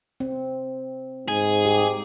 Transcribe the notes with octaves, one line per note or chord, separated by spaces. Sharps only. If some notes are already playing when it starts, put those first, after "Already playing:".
C4
G#2 G#4
G4